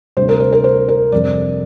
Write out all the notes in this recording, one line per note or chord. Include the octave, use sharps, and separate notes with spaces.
D2 C3 G3 C5
A#4
C5
A#4
C5
A#4
F2 C3 G3 D5